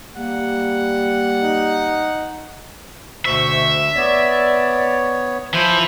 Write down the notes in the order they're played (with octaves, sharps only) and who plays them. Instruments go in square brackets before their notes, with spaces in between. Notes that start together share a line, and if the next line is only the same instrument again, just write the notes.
[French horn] G3 [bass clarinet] A#3 [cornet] F#5
[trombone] D#4
[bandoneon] D2 [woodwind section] B2 C5 C#6 [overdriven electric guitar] E5
[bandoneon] B3 C#5 [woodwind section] D5
[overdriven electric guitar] E3 E4 [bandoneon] F3 C5